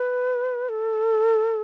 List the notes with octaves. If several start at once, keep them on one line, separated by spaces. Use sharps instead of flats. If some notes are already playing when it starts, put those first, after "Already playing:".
Already playing: B4
A4